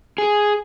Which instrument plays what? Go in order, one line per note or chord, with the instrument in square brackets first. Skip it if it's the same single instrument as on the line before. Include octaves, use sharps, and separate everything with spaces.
[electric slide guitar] G#4